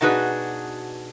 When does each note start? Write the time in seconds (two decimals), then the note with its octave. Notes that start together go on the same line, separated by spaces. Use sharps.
0.01 B2 D4 D#4 F#4 G#4 B4